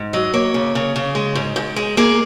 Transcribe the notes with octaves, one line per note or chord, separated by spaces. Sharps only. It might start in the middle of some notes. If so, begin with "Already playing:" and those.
Already playing: G#2
F#3 D#5
A#3 C#5
C#3
C#3
C#3
G#3
G#2
G#2
G#3
A#3 G#4